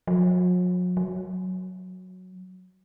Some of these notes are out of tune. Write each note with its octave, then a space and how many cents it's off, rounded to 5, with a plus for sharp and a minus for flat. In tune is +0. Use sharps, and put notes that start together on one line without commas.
F#3 -45
F#3 -5